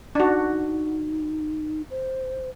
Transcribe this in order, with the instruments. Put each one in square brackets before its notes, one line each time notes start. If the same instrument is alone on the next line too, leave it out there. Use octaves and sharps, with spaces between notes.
[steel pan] D4 F#4 [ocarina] D#4
[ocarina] C5